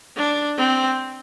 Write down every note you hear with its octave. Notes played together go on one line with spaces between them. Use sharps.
D4
C4